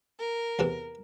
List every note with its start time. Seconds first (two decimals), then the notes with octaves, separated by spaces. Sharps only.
0.19 A#4
0.59 E2 C3 E3